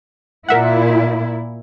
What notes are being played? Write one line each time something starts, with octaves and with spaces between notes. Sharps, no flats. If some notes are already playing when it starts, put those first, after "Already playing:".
A#2 E4 A#4 E5 F#5